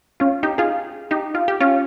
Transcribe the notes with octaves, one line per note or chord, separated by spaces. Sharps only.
C#4 F4
D#4 G4
F4 G#4
D#4 G4
F4
G4
C#4 F4